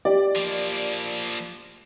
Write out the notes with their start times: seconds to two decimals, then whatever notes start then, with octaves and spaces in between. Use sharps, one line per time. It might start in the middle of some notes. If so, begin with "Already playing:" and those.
0.05 G4 D5
0.35 F3 A#3